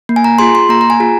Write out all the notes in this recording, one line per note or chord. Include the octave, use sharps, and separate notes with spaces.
A#3
G#5
A#5
F4 G#4 C6
C6
A#3 A#5
A#5
G#5
F4 G#4